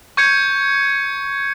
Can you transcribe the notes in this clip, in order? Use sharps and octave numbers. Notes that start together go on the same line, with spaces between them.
C#6 G6 G#6 C#7